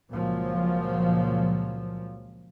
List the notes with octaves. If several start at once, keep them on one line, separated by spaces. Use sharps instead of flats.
C#2 A#2 F3 F#3